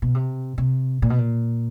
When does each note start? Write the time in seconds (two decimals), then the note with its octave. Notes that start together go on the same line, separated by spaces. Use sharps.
0.02 B2
0.15 C3
0.58 C3
1.02 A#2
1.10 B2
1.18 A#2